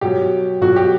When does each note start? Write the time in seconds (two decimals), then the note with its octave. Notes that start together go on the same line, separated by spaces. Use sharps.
0.01 B2 F#3 G4
0.61 B2 F#3 F#4
0.76 G4